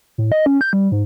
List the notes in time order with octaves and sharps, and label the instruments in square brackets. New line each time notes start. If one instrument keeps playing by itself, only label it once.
[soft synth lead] A2
D#5
C#4
G6
G3
G#2